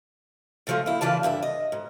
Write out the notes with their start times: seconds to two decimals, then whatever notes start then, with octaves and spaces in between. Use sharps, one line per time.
0.67 A2 C#3 F3 G#3 A3
0.86 A#3 E4
1.01 D2 C#3 E3 F4 D5 A5
1.23 G2 D3 A4 E5
1.43 D#5
1.72 G#2